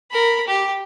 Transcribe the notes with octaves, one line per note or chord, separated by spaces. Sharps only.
A#4 B5
G4